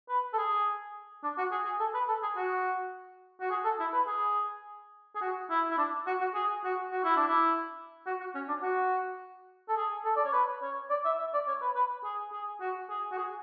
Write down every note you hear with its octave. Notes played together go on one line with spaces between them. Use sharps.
B4
A4
G#4
D4
F#4
G#4
G#4
A4
B4
A4
G#4
F#4
F#4
G#4
A4
E4
B4
G#4
G#4
F#4
E4
E4
D4
F#4
F#4
G#4
F#4
F#4
E4
D4
E4
F#4
F#4
C#4
D4
F#4
A4
G#4
A4
D5
C#5
B4
C#5
D5
E5
E5
D5
C#5
B4
B4
G#4
G#4
F#4
G#4
F#4
G#4